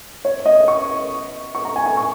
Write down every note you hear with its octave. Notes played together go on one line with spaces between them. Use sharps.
C#5
D#5
C#6
C#6
A#5
G#5
G#5
C#6